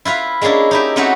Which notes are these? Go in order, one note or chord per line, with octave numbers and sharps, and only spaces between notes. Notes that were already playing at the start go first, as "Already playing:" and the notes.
E4 F4 B4 F5
G#3 A#3 C#4 D4 E4
D#4 E4 G4
A3 C4 C#4 D#4 F#4 B4